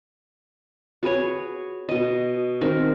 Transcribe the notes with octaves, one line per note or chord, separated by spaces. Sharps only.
F#4 G#4 B4 C#5
B2 D#5
D#3 C4 D#4 A#4